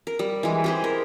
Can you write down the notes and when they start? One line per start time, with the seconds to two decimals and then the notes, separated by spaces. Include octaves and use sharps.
0.07 A#4
0.19 G3
0.43 E3 G#3
0.64 G4 G#4 C5
0.84 A#4